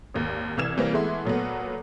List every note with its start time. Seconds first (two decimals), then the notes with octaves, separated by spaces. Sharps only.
0.14 G#1 D#2
0.57 C2 E3 E6 F6 G#6 E7
0.77 C3 E3 G3 A#3 C4
0.93 E3 G#3 A3 B3 E4 C6
1.25 A#2 F#3 A3 B3